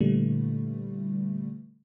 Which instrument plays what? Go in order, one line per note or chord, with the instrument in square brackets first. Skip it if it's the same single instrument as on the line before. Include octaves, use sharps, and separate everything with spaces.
[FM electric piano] A#2 D3 E3 G3 A3